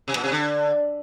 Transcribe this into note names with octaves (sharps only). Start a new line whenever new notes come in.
C3
A#2
C3
D3